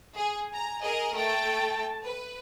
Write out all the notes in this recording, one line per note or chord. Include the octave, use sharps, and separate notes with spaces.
G#4 G#5
A#5
G#4 A#4 D#5
A3 G5 A5
B4